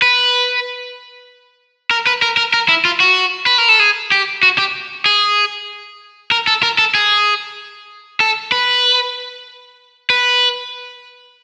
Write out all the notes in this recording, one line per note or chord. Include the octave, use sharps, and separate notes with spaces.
B4
A#4
B4
A#4
A#4
A#4
E4
F4
F#4
B4
A#4
A4
G#4
G4
F#4
G4
G#4
A#4
A4
A#4
A4
G#4
A4
B4
B4